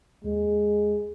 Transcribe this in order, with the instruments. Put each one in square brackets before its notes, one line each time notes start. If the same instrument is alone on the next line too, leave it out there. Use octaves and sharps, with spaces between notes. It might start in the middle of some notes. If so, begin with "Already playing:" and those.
[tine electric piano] D#2 [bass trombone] G#3